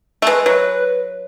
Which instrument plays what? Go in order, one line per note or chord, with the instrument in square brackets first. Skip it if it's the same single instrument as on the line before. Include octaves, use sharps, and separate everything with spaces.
[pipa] A3
[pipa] G#3 [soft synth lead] B4
[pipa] F#3 [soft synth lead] B4